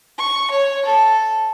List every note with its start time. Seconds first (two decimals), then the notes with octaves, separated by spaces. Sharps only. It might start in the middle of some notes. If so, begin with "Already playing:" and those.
0.18 C#6
0.50 C#5
0.85 A4